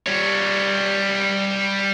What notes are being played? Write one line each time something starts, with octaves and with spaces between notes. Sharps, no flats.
G3 C#5